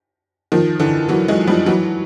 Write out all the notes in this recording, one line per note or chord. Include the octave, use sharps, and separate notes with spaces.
D#3 F3
D3 E3
E3 F#3
F#3 G#3
F3 G3
E3 F#3